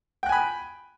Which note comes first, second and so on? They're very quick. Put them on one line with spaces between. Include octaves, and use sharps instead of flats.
G5 F#6 G#5 B5